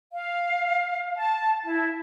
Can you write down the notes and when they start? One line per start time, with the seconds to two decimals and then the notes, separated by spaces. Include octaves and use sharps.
0.12 F5
1.15 A5
1.65 E4